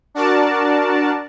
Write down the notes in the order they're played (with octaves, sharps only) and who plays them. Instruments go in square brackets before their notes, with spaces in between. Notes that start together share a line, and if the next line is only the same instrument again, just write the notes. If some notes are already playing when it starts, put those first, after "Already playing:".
[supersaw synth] D4 F#4 A#4 D5 A5